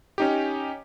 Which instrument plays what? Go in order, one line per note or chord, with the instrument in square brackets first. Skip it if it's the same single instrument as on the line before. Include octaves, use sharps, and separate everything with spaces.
[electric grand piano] C#4 D#4 G4